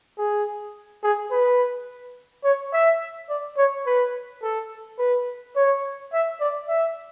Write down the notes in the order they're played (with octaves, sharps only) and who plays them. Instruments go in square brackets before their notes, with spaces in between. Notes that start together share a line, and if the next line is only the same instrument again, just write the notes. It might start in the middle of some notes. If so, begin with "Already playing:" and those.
[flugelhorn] G#4
G#4
B4
C#5
E5
D5
C#5
B4
A4
B4
C#5
E5
D5
E5